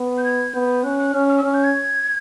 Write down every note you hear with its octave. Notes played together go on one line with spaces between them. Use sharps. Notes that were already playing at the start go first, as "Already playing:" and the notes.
Already playing: B3
G6
G#6
B3 G6
C#4 F#6
F#6
C#4 F6
F6
E6
C#4 F6
G6
G#6